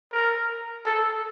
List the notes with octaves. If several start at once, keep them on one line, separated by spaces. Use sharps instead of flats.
A#4
A4